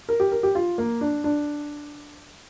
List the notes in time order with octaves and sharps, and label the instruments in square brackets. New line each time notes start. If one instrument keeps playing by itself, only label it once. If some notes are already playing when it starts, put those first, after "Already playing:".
[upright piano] A#4
G4
A#4
G4
F4
A#3
D4
D4